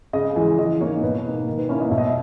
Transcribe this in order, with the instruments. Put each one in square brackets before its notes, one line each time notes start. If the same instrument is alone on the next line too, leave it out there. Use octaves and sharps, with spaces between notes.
[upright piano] C#3 D#5
E3 G#3
E3 D#5
A#3 D#4 C#5
B2 B4
A#3 D#4
D#3 A#4
B4
A#3 C#4 E4 C#5
D#5
B2 E5
D#5
E5